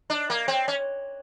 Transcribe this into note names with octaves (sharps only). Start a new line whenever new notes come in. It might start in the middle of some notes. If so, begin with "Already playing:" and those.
D4
A#3
C4
C#4